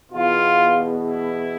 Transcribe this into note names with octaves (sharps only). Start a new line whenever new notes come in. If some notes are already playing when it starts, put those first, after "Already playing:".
E2 B2 F4
E4